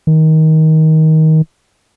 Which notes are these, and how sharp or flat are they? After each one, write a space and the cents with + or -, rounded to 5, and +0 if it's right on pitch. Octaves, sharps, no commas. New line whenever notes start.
D#3 +20